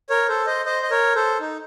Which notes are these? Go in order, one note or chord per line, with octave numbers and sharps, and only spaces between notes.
A#4 C#5
A4 C5
C5 D#5
C5 D#5
D#5
A#4 C#5
A4 C5
D#4